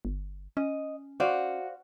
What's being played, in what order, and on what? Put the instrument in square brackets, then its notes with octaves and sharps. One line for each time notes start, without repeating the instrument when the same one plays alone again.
[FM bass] G1
[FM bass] C#4 [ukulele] D#5
[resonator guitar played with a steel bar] F#4 [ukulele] C5 D5 F5